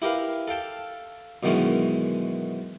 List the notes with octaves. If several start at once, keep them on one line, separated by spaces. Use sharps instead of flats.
E4 G4 A#4 B4 F5
A4 F5 G5 A5
F#2 B2 D#3 E3 G#3 C#4